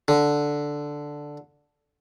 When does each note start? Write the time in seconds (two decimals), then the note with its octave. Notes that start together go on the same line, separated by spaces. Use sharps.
0.08 D3